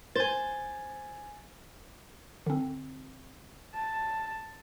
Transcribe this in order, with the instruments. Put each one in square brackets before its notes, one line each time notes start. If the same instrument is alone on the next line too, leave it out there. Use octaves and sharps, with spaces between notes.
[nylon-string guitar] C5 [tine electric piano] G#5 A6
[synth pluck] D3 C4
[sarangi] A5